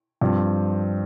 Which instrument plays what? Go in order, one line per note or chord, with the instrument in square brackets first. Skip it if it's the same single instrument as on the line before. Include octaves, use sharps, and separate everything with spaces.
[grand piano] G2 F3 C4